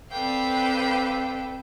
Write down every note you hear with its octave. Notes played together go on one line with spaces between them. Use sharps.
C4 A4 B4 D5 F5 G5